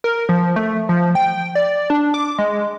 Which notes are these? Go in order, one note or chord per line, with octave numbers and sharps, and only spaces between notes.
A#4
F3
A3
F3
G5
D5
D4
D6
G#3